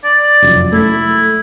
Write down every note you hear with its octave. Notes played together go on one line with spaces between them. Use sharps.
D5
F1 F#2
A3 E4